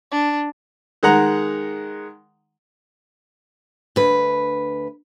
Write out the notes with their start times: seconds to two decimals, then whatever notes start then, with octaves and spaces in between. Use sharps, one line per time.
0.11 D4
1.03 D#3 G#3 F#5 A#5
3.96 D2 B4